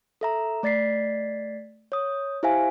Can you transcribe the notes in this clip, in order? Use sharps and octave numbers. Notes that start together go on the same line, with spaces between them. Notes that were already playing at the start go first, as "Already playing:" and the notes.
A4 E5 A#5
A3 D5 A6 B6 C7
C#5 D#6
E4 G4 C5 E5 F5 G#5